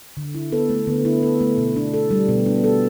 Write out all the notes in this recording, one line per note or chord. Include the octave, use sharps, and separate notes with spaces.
D3
E4
B3 A4
A3
D3 B3
E4
A4
A3
B2
D4
A4
G3
B2 B3
D4
A4